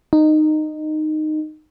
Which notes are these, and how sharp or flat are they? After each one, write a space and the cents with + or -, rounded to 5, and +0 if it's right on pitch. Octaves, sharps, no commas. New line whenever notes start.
D#4 -15